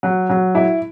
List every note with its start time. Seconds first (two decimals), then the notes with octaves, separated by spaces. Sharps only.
0.03 F#3
0.30 F#3
0.55 E4